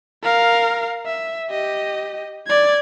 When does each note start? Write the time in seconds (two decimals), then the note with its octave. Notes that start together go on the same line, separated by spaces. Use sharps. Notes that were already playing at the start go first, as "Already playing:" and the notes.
0.23 A#4 F5
1.06 E5
1.50 G4 D#5
2.47 D5 G#6